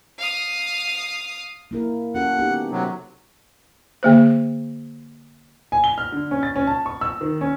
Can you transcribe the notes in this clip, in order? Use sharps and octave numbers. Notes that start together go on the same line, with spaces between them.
F5 D#6
A#3 E4 A#4
C#4 F#4 A4 F#5
B3 D#4 G4
C3 F#3
D3 A#3 C5
G#5
G7
F6
D3
C#4
A6
C#4
A5
C#6
E6
D#3
C#4